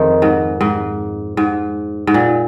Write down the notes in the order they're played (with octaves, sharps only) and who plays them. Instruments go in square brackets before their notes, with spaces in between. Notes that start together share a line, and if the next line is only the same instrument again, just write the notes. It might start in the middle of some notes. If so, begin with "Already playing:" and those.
Already playing: [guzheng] F2 D#3 G#3 D#4
[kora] G#2
G#2
G#2
G#2
A#2